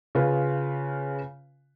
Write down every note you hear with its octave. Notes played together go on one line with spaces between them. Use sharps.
C#3 F4 B4